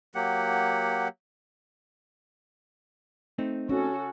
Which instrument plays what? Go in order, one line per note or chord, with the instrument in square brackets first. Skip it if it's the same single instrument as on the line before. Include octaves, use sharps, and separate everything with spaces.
[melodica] F#3 A#3 G4 F#5
[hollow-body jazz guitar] A3 C4 D#4
[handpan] C#4 [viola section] F#4 A4